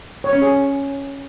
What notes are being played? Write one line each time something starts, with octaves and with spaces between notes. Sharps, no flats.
C#5
C#4
G#4